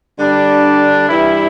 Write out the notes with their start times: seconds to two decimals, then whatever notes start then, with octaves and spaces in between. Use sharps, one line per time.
0.19 D3 G3 D4
1.09 G2 E3 G3 E4